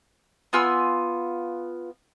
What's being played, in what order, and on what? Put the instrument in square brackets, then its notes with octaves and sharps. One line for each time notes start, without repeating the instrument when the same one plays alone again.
[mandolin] B3 F4 G#5 E6